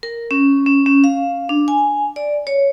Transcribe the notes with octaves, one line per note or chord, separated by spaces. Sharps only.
A#4
C#4
C#4
C#4
F5
D4
G#5
D5
C#5